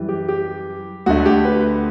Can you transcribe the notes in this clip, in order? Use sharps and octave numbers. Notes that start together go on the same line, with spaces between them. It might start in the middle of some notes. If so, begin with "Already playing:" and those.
Already playing: F#2 E3 G3
G4
G4
D2 D3 A3 F#4
G4
B4